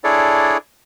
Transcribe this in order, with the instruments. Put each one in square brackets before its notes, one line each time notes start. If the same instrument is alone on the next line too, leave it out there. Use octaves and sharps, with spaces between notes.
[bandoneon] D4 E4 G#4 A4 C#5 D5